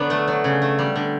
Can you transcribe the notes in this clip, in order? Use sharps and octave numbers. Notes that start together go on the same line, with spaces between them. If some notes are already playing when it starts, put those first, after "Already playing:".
Already playing: D3 F#3 B3 D4
A3
F#3
C#3
A3
G3
D3